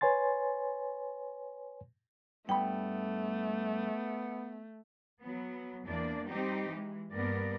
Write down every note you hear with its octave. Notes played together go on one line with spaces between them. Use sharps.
B4 C#5 G#5 C6 A6
G2 A3 B3 G5 B5
F#3 B3
E2 A#3 D4 D5
G3 C4 D#4 G4
E3 G#3
G2 A#3 B3 A#4 D5